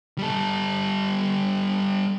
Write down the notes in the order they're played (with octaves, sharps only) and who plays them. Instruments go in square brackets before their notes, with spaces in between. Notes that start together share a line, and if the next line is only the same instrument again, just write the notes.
[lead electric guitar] G3 A4